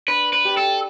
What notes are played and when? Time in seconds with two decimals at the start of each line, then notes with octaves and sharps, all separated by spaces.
0.08 D4 B4
0.33 B4
0.45 G4 D5
0.57 A4